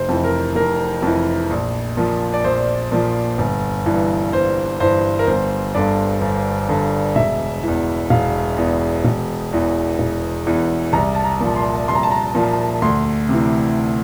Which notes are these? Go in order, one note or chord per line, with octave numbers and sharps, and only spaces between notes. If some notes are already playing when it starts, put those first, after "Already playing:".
Already playing: F1 C5
F2 E3
A#4
F1 A#4
F2 E3
A#1
A#2 F3
D5
A#1 C5
A#2 F3
G1
G2 E3
G1 C5
G2 E3 C5
A#4
G1 C5
G2 D3 D5
G1
G2 D3
E1 E5
E2 E3
E1 F5
E2 E3
E1
E2 E3
E1
E2 E3
C2 A#5
A5
A#5
A#2 F3
C6
C2 C6
A#5
A5
A#5
A#2 F3
D2 C6
C3 E3